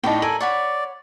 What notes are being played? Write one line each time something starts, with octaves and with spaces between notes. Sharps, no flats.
A2 D#4 A4 D5 G5
A4 A#4 G#5 F#7
C#5 D5 F#5 B5